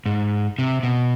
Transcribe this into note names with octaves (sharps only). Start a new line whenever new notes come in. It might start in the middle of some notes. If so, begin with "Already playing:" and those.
G#2
C3
B2